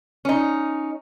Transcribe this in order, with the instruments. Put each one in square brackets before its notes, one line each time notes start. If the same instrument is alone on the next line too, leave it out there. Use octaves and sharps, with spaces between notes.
[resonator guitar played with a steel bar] C#4 D#4